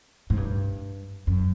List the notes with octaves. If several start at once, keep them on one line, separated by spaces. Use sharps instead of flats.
G#2
G2
F#2